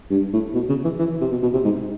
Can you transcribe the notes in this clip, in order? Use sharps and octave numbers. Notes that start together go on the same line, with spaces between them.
G2
A2
B2
C#3
E3
E3
C3
B2
B2
C3
G#2